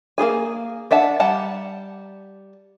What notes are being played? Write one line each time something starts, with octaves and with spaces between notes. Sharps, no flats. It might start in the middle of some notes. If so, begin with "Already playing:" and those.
A#3 F4 G#4 G#5
D4 E5 F#5 A5
G3 F#5 A5 A#5